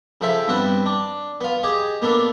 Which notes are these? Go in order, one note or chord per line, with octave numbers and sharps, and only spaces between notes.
C#3 F3 A4 E5 G5
G2 B3 C4 F#5 G5
D4
B3 F4
G4 G#4 D#5
A#3 B3 D4 A4